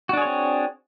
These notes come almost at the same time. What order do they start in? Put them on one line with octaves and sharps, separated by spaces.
F#4 D4 G#4 C#5 C4